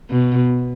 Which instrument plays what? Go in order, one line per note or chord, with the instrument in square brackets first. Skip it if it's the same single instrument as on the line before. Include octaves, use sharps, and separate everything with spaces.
[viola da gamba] B2